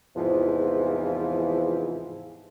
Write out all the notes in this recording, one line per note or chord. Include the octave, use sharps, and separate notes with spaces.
E2 G#2 C3 E3 F3